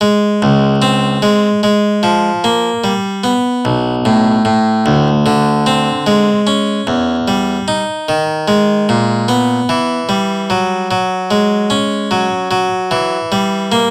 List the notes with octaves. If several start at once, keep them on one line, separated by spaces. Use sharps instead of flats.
G#3
C#2
C4
G#3
G#3
F3
A#3
G3
B3
B1
A2
A2
D2
D3
C4
G#3
C#4
E2
G3
D#4
D#3
G#3
A#2
B3
E3
G3
F#3
F#3
G#3
C#4
F#3
F#3
E3
G3
A#3